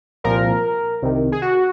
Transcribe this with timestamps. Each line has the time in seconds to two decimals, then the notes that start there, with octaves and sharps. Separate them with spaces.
0.24 C2 A#2 F3 A#4
1.02 C2 C3 D#3
1.32 G#4
1.42 F#4